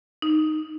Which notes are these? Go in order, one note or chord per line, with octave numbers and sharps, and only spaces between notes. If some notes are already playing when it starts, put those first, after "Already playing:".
D#4